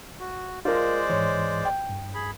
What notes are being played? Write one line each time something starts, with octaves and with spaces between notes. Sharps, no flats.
F#4
G#3 F4 A#4 C5 D5
G#2 E3 C#5
G5
G2
G#4 B5